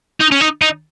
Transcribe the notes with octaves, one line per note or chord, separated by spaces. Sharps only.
D#4
C#4
D#4
D#4